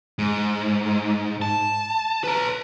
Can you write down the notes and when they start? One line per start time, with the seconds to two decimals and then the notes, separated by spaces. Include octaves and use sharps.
0.19 G#2
1.42 A5
2.24 B4 A#5